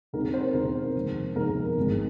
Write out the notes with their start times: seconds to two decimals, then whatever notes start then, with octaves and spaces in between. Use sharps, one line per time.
0.13 D#2 D#3 G#3 C4 D#4 A#4
0.34 C5
0.54 D#2 D#3 G#3 C4 D#4 A#4
0.95 F1 D#2 D#3 G#3
1.35 F1 D#2 D#3 G#3 A#4
1.77 G#1 G#2 D#3 G#3